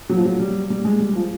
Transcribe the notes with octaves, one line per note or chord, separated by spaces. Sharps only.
F#3
F3
F#3
G3
G3
G#3
G3
F3